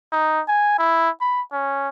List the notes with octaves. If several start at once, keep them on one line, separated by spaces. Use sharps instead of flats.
D#4
G#5
E4
B5
C#4